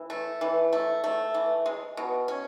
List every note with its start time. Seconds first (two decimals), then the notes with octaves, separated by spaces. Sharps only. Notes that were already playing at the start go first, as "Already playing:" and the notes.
Already playing: E3
0.10 A3
0.41 E3
0.73 A3
1.04 A3
1.34 E3
1.66 G#3
1.97 B2
2.28 C#4